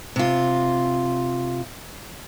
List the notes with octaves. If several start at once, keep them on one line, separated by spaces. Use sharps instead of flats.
C3 F4